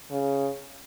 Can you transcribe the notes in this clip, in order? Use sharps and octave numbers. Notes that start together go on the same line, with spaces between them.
C#3